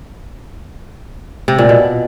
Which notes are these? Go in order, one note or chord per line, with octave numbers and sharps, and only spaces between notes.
C3
A#2
B2